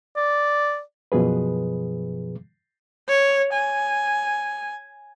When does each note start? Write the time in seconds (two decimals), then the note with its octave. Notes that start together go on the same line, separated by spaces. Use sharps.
0.16 D5
1.12 F#2 B2 F3 G#4 B4
3.09 C#5
3.53 G#5